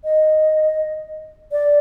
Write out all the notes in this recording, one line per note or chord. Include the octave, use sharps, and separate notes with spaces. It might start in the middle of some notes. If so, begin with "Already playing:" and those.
D#5
D5